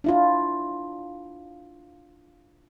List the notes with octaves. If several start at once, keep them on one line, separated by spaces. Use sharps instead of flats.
D4 E4 F4